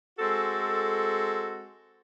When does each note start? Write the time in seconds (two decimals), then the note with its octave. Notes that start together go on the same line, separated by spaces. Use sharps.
0.18 G#3 C4 F#4 A4